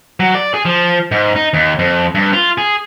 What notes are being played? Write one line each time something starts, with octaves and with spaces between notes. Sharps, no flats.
F#3
D5
G#4
F3
G#2
D#4
D#2
F2
G2
F4
G#4